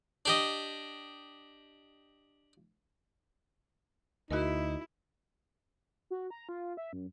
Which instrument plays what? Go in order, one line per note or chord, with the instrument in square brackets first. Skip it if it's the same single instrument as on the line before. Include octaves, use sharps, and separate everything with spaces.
[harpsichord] D4 G4 D#5
[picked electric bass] D2 [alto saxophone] D#4 [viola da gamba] E4 [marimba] F#4 A#4
[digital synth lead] F#4
A#5
F4
E5
F#2